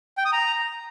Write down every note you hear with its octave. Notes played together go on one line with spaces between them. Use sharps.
G5
D#6
A#5